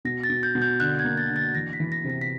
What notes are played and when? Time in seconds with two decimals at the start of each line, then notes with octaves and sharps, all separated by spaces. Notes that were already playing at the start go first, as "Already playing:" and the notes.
0.05 B2 A#6
0.24 A6
0.29 B2
0.43 G6
0.55 B2
0.62 G6
0.80 D3 F#6
0.99 G#6
1.05 A#3
1.18 A6
1.29 D3
1.36 A6
1.55 E3 A#6
1.73 B6
1.80 E3
1.92 A#6
2.04 C3
2.10 A#6
2.21 B6